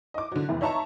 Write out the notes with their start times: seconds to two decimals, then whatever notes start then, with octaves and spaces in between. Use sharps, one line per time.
0.14 D#5 D6
0.32 D3 F#3
0.49 F1 E2
0.61 D#4 C#5 E5 A5 A#5 C#6